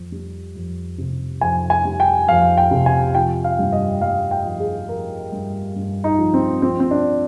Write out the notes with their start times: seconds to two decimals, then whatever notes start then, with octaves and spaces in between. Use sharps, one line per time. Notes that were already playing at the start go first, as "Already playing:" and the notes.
Already playing: F2
0.12 G3
0.55 F2
0.98 C3
1.41 F2 G#5
1.70 G#5
1.85 G3
2.00 G5
2.29 F2 F5
2.58 G5
2.71 C3
2.86 G#5
3.15 F3 G5
3.44 F5
3.59 G2
3.73 D#5
4.02 G2 F5
4.31 G5
4.45 F3
4.60 G#4
4.89 F3 A#4
5.32 G2
5.75 G2
6.04 D#4
6.19 F3
6.34 C4
6.62 F3 C4
6.80 C4
6.91 D4